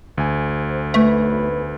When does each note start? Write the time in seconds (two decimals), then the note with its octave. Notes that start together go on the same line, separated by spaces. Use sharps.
0.17 D2 G#5
0.60 C5
0.94 B1 A3 B4